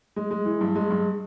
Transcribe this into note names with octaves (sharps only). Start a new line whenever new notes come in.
G#3
G#3
E3
G2
G#3
G2